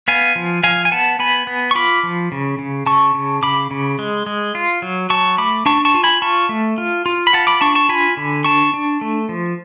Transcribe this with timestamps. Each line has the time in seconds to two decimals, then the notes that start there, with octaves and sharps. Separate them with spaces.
0.08 B3 F5 G#5
0.36 F3
0.63 F3 F5 G#5
0.85 G#5
0.92 B3 F#5 A5
1.19 B3 G#5 B5
1.47 B3
1.71 C#6
1.75 F4 B5 D6
2.03 F3
2.32 C#3
2.59 C#3
2.86 C#3 A5 C#6
3.15 C#3
3.43 C#3 B5 D6
3.71 C#3
3.99 G#3
4.26 G#3
4.55 F4
4.82 F#3
5.10 F#3 A5 C#6
5.38 A3 B5 D6
5.66 D4 A5 C#6
5.85 A5 C#6
5.94 F4
6.04 G#5 B5
6.22 F4 A5 C#6
6.49 A3
6.78 F4
7.06 F4
7.27 B5
7.33 F4 F#5 A5
7.47 B5 D6
7.61 D4 A5 C#6
7.75 A5 C#6
7.89 F4 G#5 B5
8.17 D3
8.44 D4 A5 C#6
8.73 D4
9.01 A3
9.29 F3